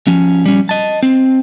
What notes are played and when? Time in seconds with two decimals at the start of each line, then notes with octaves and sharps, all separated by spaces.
0.07 F3 C#4
0.46 G3 C#4
0.69 D#5 A5
1.03 C4